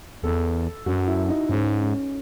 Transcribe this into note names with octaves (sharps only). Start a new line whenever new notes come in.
E2 A4
F#2 F#4
E4
D#4
G#2 C#4
C#4